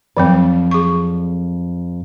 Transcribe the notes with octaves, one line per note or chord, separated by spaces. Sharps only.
F2 C#3 E3 F#3 C4 D5
G#4 C#6